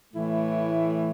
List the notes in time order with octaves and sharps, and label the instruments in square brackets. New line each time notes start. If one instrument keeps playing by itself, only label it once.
[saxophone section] A2 E3 A3 E4